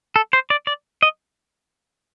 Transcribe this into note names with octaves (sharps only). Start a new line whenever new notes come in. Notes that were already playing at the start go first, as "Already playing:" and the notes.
A4
C5
D5
D5
D#5